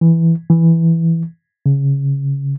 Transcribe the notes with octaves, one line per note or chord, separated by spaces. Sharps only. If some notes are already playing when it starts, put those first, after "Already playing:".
E3
E3
C#3